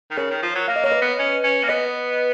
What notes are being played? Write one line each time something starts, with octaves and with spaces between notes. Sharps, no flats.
D#3
C#3 A#4 C#5
D#3
F3
F#3
A#3 F5
D#5
A#3 C#5
B4 D#5
B3
C#4
C#4
A#3
B3 B4 D#5